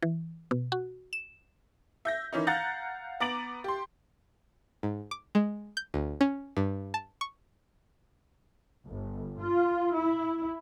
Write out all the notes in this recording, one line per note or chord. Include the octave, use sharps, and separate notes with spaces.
E3
B2
F#4
E7
E5 G6 A#6
D#3 E3 C#4 D#4
F5 F#5 A#5 F#6 G6 A6
B3 A#5 D6 A6 D7 F#7
G4 C6
G#2
D6
G#3
G6
D2
C#4
G2
A5
C#6
G1
F4
E4